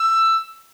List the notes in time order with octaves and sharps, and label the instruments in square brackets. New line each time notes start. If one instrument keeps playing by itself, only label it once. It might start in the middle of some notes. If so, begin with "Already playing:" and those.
Already playing: [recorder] E6